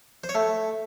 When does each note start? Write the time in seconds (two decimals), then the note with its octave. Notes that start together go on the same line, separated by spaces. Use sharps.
0.24 C5
0.29 C#5
0.35 A3